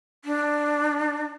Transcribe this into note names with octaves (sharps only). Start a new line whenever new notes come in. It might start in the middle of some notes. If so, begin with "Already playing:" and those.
D4